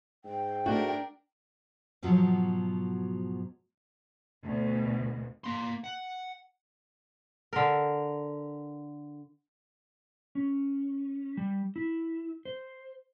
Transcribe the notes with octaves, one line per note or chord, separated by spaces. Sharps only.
G#2 G5
A3 D4 F#4 A#4
G#2 B2 F3 F#3
D2 B2
A#3 C6
F#5
D3 A#4
C#4
G3
E4
C5